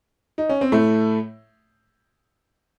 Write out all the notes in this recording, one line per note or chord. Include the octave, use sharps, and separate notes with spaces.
D#4
C#4
C4
A2 A3